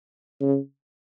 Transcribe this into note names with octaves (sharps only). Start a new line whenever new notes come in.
C#3